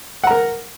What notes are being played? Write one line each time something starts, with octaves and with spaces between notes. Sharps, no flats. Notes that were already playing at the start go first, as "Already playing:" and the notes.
A#4 F#5 A#5